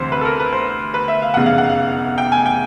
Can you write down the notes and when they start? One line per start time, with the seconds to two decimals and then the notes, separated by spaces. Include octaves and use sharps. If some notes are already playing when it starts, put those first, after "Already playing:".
Already playing: D2 C3 E3 C5
0.12 B4
0.21 A4
0.25 A#4
0.40 B4
0.53 C5
0.94 B4
1.08 E5
1.22 F5
1.34 F1 E2 C#3 F#5
1.46 F5
1.58 F#5
1.69 F5
2.18 G5
2.32 G#5
2.46 G5